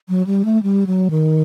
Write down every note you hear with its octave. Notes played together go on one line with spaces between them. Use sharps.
F#3
G3
A3
G3
F#3
D#3